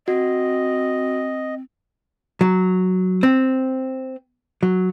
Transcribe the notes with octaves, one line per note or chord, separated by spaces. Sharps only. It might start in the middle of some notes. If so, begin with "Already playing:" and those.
C4 F#4 D#5
F#3
C4
F#3